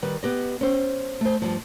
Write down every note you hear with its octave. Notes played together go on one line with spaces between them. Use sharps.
D#3 G3 B4
B3 G4 D#5
C#4 C5
A3 C5
G2 F3